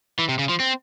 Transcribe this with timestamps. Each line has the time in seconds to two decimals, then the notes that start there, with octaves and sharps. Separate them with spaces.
0.19 E3
0.29 C3
0.39 C#3
0.49 F3
0.60 C4